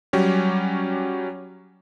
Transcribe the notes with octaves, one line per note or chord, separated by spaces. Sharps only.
F#3 G3 C#4 G4